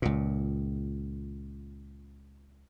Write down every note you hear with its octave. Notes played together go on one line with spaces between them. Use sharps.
C#2 A#2